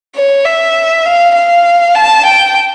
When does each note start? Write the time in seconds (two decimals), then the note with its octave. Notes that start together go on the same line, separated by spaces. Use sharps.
0.16 C#5
0.45 E5
1.06 F5
1.35 F5
1.95 A5
2.26 G5